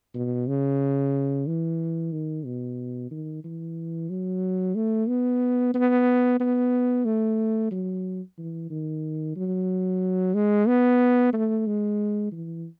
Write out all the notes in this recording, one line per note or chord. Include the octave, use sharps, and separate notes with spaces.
B2
C#3
E3
D#3
B2
D#3
E3
F#3
A3
B3
B3
B3
A3
F#3
E3
D#3
F#3
G#3
B3
A3
G#3
E3